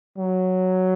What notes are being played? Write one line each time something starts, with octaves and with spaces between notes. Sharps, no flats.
F#3